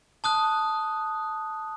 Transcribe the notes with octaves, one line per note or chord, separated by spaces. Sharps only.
A5 D#6 F#6